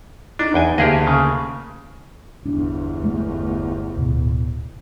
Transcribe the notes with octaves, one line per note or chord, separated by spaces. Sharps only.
D4 D#4
E2 G5 G#5
D2 A#3 G4 G#4 D#5
C#3
G1 E2 D4
A3
D1 B2